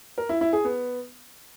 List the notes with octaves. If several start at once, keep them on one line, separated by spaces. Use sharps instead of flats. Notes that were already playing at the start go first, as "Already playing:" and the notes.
A#4
E4
E4
G#4
B3